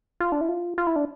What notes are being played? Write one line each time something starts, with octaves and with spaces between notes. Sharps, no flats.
F4
D4
E4
F4
F4
E4
D4